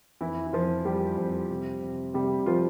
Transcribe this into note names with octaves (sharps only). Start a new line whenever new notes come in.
F2 E3 E4
E4
F2 F3 F4
F2 G3 G4
F2
C3
C3
C3 G3 G4
F3 F4